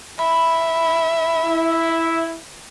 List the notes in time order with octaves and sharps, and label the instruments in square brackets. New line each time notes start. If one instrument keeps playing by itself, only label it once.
[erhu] E5 [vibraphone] B5
[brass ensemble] E4